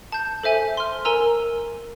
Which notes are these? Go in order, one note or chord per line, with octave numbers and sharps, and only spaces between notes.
A5 G6
A4 C5 E5 G#5
C6 F6
A#4 G#5 A#5 E6